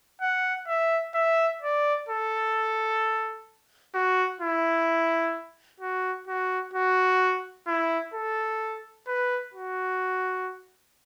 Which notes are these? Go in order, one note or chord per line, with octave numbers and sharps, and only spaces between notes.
F#5
E5
E5
D5
A4
F#4
E4
F#4
F#4
F#4
E4
A4
B4
F#4